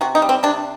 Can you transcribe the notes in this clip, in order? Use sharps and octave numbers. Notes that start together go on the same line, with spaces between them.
C3 F#4
D#4
G3
C4
C3 D4